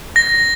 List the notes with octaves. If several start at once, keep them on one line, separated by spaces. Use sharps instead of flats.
A#6